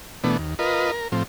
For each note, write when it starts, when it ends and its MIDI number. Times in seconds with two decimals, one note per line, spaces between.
0.24 0.37 47
0.24 0.37 52
0.24 0.37 57
0.24 0.37 59
0.24 0.37 62
0.39 0.54 39
0.59 0.91 65
0.59 0.91 70
0.59 0.91 71
0.59 0.91 75
0.91 1.08 70
1.12 1.23 45
1.12 1.23 53
1.12 1.23 60